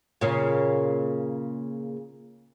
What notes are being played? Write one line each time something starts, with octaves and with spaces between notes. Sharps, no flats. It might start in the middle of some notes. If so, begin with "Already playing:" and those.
A#2 C#3